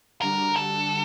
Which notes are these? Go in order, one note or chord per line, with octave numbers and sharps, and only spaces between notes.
D3 G3 D4 F#4 A#4
A4